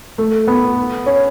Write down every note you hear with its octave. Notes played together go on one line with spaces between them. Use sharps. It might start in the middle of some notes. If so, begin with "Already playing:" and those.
A3
B3
C#4